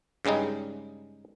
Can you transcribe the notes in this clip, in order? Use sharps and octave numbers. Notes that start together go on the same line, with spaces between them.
G2 C#3 G3 G#3 D#4